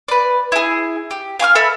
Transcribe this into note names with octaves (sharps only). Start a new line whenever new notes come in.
B4 D5
E4 G#4
G4
F5 G#5 D6 F6
A4 E5 B5